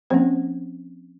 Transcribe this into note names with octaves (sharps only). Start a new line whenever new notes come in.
F3 A#3 C4 C#4 C5